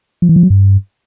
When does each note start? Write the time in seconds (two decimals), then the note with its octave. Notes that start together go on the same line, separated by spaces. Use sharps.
0.22 F3
0.29 E3
0.36 F3
0.43 F#3
0.50 G2